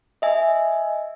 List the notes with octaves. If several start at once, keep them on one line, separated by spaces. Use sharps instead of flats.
D#5 E5 G#5